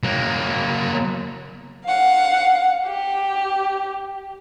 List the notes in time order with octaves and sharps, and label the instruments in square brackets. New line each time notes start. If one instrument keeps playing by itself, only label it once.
[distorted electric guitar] F#3 A#3
[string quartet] F5 F#5
G4